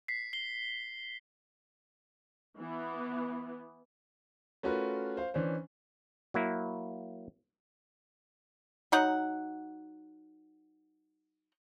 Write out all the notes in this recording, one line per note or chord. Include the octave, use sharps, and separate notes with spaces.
B6 C7
C7 G7
E3 B3
A3 C#4 F4 F#4 A#4 B4
C5 F5
E3 C#4 D4 C5
F#3 A#3 E4
F#3 D#4 F#5